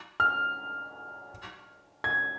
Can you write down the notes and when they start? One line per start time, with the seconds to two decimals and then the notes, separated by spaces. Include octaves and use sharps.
0.20 F6
2.04 G#6